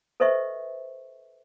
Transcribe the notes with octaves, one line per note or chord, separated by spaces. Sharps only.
A4 B4 C5 D#5 E5 C#6